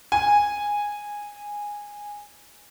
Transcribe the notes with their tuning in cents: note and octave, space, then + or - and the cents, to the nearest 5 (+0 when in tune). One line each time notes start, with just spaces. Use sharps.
G#5 -10